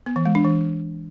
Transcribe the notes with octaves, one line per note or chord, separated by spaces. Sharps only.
B3
E3
G#3
D4
E3